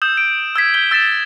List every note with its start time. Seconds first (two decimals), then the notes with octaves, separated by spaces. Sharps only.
0.02 D#6 E6 G6 E7
0.17 D7
0.56 E6 G#6 B6
0.74 G6 B6 G7
0.91 E6 A6 B6 E7